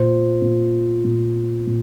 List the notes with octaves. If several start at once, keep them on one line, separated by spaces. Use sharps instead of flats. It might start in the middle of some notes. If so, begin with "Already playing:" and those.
Already playing: A#2 C5
A#2
A#2
A#2